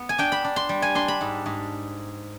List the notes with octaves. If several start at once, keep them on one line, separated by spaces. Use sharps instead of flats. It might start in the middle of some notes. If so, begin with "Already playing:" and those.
Already playing: B3
G#5
D4 G5
B5
D4
C6
G3
G#5
D4 C6
B5
G#2
G#2